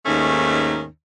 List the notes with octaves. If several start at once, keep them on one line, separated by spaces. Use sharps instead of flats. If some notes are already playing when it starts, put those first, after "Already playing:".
D#2 G#2 D#3 A3 C#4